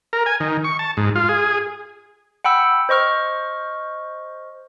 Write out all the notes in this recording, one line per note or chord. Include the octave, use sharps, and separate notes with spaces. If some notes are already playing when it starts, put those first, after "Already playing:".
A#4
G#5
D#3
C#6
A5
G#2
F4
G#4
F#5 G5 B5 E6
C5 D#5 C#6 F6